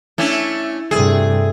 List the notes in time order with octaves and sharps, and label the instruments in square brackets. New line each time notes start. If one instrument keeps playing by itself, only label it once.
[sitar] A3 C#4 D4 [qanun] E4
[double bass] G2 C3 [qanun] A3 [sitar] G#4